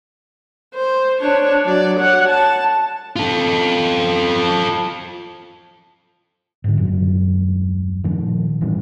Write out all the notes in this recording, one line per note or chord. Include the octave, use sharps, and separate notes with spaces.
C5
D4 C#5
F#3 D5
C#5 F#5
A5
F4 A4
G#2 D3
D#1 F#2 F#3
A#2 D#3 F3
G#1 E3 G3 C#4